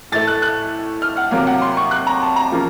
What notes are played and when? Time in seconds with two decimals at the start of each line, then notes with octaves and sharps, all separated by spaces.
0.12 A2 A3 A6
0.27 F#6
0.42 F#6
1.02 F6
1.17 F#5
1.31 C3 F#3 A#3 F5
1.47 F#5
1.62 C6
1.77 C#6
1.91 F#6
2.07 A#5
2.22 A5
2.36 A#5
2.52 C#3 F3 A#3